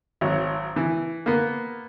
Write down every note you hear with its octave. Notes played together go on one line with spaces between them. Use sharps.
G#1 F#3
E3
A#3 B3